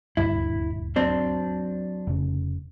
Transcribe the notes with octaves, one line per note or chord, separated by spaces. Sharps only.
D#1 D2 G2 E4
F#3 C4 D4
F1 C#3